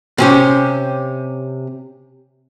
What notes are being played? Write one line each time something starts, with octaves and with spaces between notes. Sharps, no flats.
C3 C#4 G4